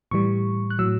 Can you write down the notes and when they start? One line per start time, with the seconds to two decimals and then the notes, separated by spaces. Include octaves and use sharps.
0.11 A2 E3 G3 C#6
0.70 F#6
0.79 A2 F#3 E6